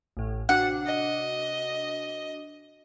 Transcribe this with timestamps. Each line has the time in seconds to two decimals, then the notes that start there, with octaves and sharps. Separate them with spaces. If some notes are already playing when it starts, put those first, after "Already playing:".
0.17 A1 A2
0.49 C3 D4 F#4 F#5
0.86 D#5